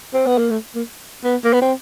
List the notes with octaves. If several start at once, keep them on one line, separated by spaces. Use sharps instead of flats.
C4
B3
A#3
A3
A#3
B3
A#3
B3
C4